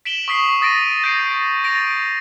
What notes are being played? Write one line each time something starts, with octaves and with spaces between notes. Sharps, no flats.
B6 D7 E7 F#7 G7
C#6 D#6 B6 C7 F#7
D#6 A6 A#6 D7 D#7
G6 A6 A#6 C7 D7
A6 A#6 D7 D#7 F7